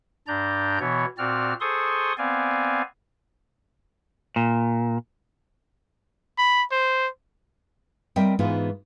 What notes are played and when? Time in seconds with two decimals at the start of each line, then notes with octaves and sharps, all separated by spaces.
0.28 G2 D4 D5 A#5 G6
0.79 B2 E3 B3 C#5
1.18 A#2 C4 F#4 D5 F6
1.61 G#4 A4 C5 C6 C#6 D#6
2.18 B3 C4 D5 F5 G#5
4.36 A#2
6.38 B5
6.72 C5
8.16 G3 C4 A#4 D#5 E5 G5
8.39 G#2 E3 G#3 B3 D#4 F4